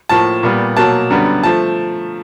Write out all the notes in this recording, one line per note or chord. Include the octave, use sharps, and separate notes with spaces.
A2 F3 A#3 A5
A#2 G3 B3
B2 F#3 A#3 A5
F#2 D3 G3 B3
F3 A3 A5